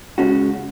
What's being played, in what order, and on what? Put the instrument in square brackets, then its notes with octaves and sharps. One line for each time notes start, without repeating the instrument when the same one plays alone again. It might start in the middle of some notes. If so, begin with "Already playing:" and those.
[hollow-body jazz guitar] C#3 G#3 C#4 F#4